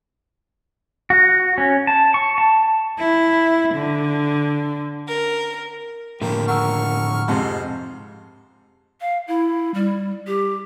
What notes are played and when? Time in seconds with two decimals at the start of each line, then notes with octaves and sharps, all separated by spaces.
1.10 F#4
1.58 C#4
1.87 A5
2.14 C#6
2.38 A5
2.98 E4
3.74 D3
5.08 A#4
6.21 A2 D3 F3 A#3 G4
6.48 F#5 A#5 C#6 E6 F6
7.28 F2 G#2 C3 C5
9.01 F5
9.28 E4
9.74 G3
10.27 G4